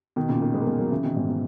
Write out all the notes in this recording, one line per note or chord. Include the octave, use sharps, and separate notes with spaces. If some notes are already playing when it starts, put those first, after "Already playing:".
B2 D#3
A#2 C#3
B2 D#3
G#3 B3
A#3
G#3 B3
F#3 A#3
C#3 E3
B2 D#3
G#2 B2
B2